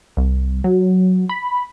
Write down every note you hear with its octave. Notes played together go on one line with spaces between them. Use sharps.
C2
F#3
B5